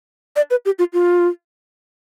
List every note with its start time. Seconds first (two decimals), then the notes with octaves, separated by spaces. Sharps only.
0.36 D5
0.51 B4
0.65 G4
0.79 F4
0.93 F4